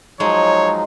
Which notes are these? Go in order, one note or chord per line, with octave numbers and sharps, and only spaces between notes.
F3 F#3 G#3 D#4 C#5